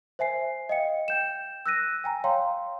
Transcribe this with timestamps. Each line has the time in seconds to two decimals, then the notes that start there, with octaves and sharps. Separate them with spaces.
0.19 C5 E5 G#5 C7
0.69 D#5 F5 G5 C#7
1.08 G5 G6 E7
1.66 E6 F#6 A#6 D#7
2.04 G5 G#5 A#5
2.24 C#5 F5 G5 A#5 C6